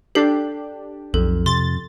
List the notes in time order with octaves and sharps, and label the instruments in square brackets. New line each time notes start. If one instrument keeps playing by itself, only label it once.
[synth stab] D4 G4 [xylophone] A4 C7
[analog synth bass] B1 [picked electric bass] F2 [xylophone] A4
[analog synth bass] C3 [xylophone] C6 [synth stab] A6